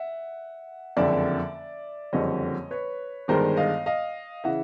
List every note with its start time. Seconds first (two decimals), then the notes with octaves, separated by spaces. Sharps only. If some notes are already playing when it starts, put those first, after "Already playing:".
Already playing: E5 F#5
0.97 F#1 F2 D3 D5 E5
2.13 F#1 F2 D3 G3 C4 C#5 D#5
2.71 B4 C#5
3.28 G1 G2 D#3 G#3 A#4 C5
3.57 D#5 F5
3.86 D#5 F5
4.44 C#3 E3 E5 F#5